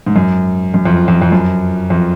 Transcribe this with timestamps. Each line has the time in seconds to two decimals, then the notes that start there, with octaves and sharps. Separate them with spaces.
0.07 G#2
0.16 F#2
0.74 F#2
0.85 F2
1.08 F2
1.22 F2
1.32 F#2
1.90 F2